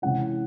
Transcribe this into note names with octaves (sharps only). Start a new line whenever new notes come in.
C3 E3 G#3 C#4 E4 F#5